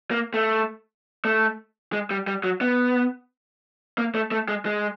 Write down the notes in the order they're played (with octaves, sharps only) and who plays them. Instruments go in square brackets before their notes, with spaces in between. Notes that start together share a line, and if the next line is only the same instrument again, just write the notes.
[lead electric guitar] A#3
A3
A3
G#3
G3
G3
F#3
B3
A#3
A3
A3
G#3
G#3